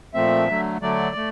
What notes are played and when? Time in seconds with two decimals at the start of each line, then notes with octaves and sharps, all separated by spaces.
0.14 A#2 F3 A3 C4 E5
0.48 D3 F#3 A3
0.81 D3 F#3 A3 D5
1.16 A3